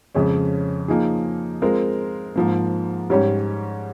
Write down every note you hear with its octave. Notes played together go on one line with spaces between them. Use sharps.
F2 C#3 G#3 C#4
F3 A#3 D#4 G#4
G#3 C4 F4 A#4
G#2 F3 A#3
G#2 G3 C#4 G4 C#5